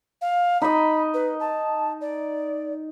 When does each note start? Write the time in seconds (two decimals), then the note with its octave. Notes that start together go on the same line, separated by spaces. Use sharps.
0.21 F5
0.62 D#4 D#5 B5
1.14 B4
1.40 A5
2.01 D5